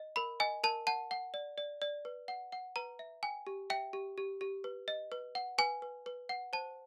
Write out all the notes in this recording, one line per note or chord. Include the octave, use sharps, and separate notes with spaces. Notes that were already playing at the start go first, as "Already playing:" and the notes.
Already playing: D#5
A#4 B5
D#5 G#5
A#4 A5
F#5 A5
F#5
D5
D5
D5
B4
F#5
F#5
B4 A#5
E5
G5 G#5
G4
E5 G5
G4
G4
G4
B4
D#5
B4
F#5
B4 G#5
B4
B4
F#5
C5 A5